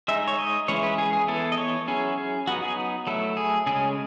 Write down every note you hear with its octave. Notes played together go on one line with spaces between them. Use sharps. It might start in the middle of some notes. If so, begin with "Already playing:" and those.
G#3 D#4 E5
C#5
D#5
E3 G#3 C#4 E4 C#5
B4
G#4
G#4
E3 B3 E4 A4
D#5
C#5
F#3 C#4 E4 G#4
G#4
F#3 B3 D#4 F#4
G#4
F#3 A3 E4 A4
G#4
C#3 G#3 C#4 G#4